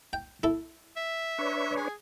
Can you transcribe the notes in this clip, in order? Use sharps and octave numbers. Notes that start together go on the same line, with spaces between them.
G5
E4 A4
E5
D4 B4 C#5
G#4